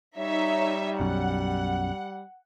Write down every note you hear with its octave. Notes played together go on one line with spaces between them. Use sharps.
G3 D#4 C#5 E5
B1 F#2 F#5